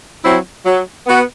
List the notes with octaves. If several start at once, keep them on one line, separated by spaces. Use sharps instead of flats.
F#3 C4 E4
F#3
B3 F#4